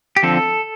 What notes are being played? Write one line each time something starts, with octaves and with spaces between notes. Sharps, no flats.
G4
D3 F3 C4 A4